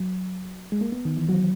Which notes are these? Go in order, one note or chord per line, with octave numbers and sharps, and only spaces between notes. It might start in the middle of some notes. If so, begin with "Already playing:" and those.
Already playing: F#3
G#3
A#3
B3
D#3
E3
F#3